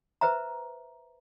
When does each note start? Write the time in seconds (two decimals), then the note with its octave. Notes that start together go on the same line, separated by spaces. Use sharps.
0.21 B4 C5 E5 A#5